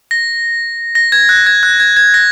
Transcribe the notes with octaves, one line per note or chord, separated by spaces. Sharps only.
A#6
A#6
G#6
F#6
G#6
F#6
G#6
G#6
A#6